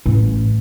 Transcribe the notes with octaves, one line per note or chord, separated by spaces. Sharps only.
A1